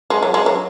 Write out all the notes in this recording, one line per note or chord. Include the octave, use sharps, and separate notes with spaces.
G#3
F#3
G#3
F#3